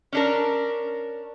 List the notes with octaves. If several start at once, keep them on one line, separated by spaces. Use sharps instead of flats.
C#4 D4 A#4